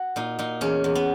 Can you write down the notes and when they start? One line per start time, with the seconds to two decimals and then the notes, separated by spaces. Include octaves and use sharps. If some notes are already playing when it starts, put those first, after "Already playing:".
Already playing: F#4
0.16 A#2 D#4
0.39 A#2 D#4
0.61 E2 C#4
0.84 E2
0.95 B3